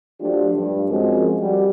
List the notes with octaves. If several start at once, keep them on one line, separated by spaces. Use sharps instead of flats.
F3 F#3 A3 D4 F4 G4
G2
F3 G#3 C4 C#4 F#4 A#4
G3 F#4